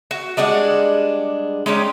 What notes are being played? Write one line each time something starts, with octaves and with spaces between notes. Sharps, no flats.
F#4
G3 G#3 D4 F#5
G#3 C#4 D#4 G4